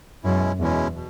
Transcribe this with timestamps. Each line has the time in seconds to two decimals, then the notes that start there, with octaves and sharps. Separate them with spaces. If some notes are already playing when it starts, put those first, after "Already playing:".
0.24 F#2 B2 G#3 C#4 E4
0.59 E2 B2 G#3 C#4 E4
0.95 B2